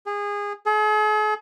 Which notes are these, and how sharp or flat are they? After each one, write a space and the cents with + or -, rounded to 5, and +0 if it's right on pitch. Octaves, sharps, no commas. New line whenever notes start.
G#4 -25
G#4 +45